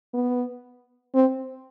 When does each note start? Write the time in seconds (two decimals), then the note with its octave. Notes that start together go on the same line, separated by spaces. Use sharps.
0.14 B3
1.15 C4